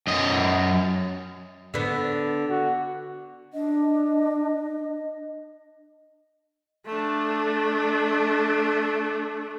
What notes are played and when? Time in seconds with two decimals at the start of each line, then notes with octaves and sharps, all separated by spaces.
0.07 F#2 D#5
1.74 D3 B3
2.50 F#4
3.53 D4 D#5
6.86 A3 D4